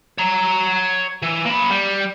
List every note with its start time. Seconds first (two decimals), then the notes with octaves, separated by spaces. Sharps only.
0.18 C#5 A#5
1.22 E3
1.45 A#3 B5
1.70 G3